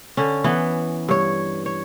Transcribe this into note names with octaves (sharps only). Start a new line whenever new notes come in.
D3 C#4
E3 B3
G2 C#5
C#5